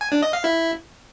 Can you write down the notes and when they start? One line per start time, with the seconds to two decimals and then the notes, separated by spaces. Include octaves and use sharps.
0.01 G#5
0.12 D4
0.22 D#5
0.33 F5
0.44 E4